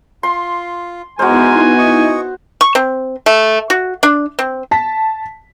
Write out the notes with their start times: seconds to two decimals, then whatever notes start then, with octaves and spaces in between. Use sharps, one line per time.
0.23 F4 C6
1.19 G#3 B3 D#4 E4 F#4 A#4 C5 G#5
1.78 D#5 C#6
2.61 C#6
2.75 C4
3.26 A3
3.70 F#4
4.03 D4
4.39 C4
4.71 A5 B6